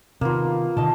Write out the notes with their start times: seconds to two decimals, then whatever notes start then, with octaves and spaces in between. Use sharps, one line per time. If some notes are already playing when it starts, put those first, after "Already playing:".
0.21 C3 D#3 A#3 B3 F4
0.77 B2 D3 D#3 D#5 A5